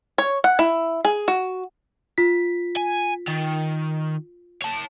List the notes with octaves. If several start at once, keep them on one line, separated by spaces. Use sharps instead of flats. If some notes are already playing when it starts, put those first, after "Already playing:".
C#5
F#5
E4
G#4
F#4
F4 B6
G#5
D#3
C#5 A5